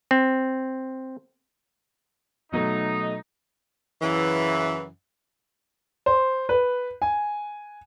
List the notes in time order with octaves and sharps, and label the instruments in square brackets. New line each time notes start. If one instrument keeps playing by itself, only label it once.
[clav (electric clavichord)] C4
[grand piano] B2 F#3 A3 [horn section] D#4
[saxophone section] F#2 C#3 E3
[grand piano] C5
B4
G#5